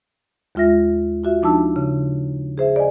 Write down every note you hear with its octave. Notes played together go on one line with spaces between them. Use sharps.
D#2 G#3 F4 E5 A#6
F4 F#4 E5
F3 D4 D#4 A5 E6
C#3
G#4 C5 E5
D5 D#5 G#5